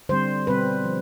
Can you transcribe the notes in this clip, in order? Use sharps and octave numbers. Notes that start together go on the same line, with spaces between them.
D3 G3 C4 C5
B2 G3 C4 B4
F3